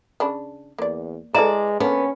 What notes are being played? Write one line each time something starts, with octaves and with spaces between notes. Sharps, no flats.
C#3 D4 B5
E2 A#3 D5
G#3 E4 A4 B4 D5 E5 A#5
D3 A#3 B3 C#4